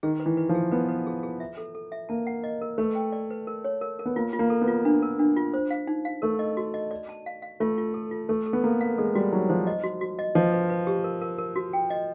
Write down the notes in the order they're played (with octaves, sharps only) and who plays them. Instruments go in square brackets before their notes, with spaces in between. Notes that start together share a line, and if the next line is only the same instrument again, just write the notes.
[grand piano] D#3 [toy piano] G#4
[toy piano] B4
[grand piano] E3
[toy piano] B4
[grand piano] F3
[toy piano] G#4
[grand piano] B3 [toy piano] B4
[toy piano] B4
G#4
G#4
E5
A4
A4
E5
[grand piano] A#3 [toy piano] A5
[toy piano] F#5
D#5
A#4
[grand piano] A3 [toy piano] B4
[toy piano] G5
D5
B4
A#4
C#5
A#4
A#4
[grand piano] B3
[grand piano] A#3 [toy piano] F4
[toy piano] F4
[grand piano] A#3
[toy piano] A4
[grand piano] B3
[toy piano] F4
D4
A#4
D4
F4
C5
F5
D#4
F5
[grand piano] A3 [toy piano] A#4
[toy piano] D#5
F#4
D#5
D5
A5
F5
F5
[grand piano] A3 [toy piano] F4
[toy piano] F4
A4
F4
[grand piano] A3 [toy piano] A4
[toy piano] A4
[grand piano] B3
[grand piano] A#3 [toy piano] A4
[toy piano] F5
[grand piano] G#3 [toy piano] A4
[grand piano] G3 [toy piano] F#4
[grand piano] F#3 [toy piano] D#4
[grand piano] F3 [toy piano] C5
[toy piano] D#5
F#4
F#4
D#5
[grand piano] F3 [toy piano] D#5
[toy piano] B4
B4
G4
A#4
A#4
A#4
F#4
G5
D#5